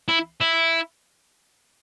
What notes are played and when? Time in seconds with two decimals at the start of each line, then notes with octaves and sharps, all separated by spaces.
0.08 E4
0.41 E4